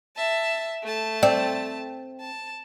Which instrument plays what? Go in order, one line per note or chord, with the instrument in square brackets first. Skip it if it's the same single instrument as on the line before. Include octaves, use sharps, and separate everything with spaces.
[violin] E5 A5
A3 A5
[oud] C4 [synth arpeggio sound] D5
[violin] A5